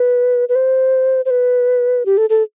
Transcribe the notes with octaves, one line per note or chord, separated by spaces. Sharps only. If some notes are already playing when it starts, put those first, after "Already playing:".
Already playing: B4
B4
C5
C5
B4
G4
A4
A4